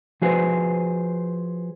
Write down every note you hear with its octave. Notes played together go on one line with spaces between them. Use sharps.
F3 F#4 G#4 B4 C5